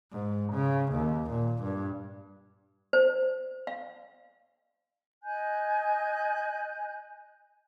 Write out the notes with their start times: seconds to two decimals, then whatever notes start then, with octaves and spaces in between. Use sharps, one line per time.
0.12 G#2
0.53 C#3
0.93 D#2
1.31 A#2
1.63 G2
2.93 C5
3.67 F5
5.24 D#5 G#5 F#6 G6